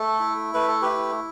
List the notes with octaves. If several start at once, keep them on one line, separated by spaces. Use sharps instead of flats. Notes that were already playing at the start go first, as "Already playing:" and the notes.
Already playing: A3 A4
E4
A3 B4
A4
G4 B4
E4